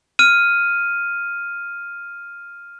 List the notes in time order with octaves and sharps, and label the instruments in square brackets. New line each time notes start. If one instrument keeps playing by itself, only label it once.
[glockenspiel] F6 D#7